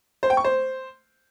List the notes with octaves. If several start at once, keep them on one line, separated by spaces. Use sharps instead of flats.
C5
G5
C#6
C5